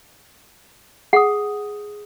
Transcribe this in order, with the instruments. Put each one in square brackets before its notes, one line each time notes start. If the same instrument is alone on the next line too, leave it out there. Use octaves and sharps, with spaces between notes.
[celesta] G#4 D#6 [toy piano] F#5